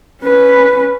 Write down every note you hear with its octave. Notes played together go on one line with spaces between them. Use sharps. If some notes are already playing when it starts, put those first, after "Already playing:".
C#4 B4